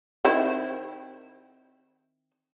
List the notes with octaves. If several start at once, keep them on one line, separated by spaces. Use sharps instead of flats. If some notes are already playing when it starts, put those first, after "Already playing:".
D#3 C4 E4